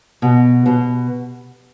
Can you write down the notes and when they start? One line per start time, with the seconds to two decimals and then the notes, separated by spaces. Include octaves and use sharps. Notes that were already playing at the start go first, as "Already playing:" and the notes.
0.22 B2
0.66 B2